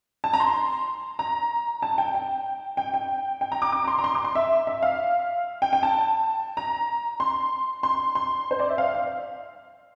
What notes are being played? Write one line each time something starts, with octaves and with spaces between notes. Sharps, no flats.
A5
A#5
C6
A#5
A5
G5
G5
G5
G5
G5
A#5
D6
D6
A#5
C6
A#5
C6
D6
C6
E5
E5
F5
G5
G5
A5
A#5
C6
C6
C6
C5
D5
E5
F5
F5